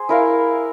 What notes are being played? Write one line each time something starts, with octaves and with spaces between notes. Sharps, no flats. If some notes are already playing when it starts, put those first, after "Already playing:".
Already playing: G#4 C5
E4 A#4 F5